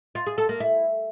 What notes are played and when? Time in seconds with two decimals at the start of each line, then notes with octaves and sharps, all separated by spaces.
0.15 F4
0.26 G#4
0.38 A4
0.49 A#3
0.60 E4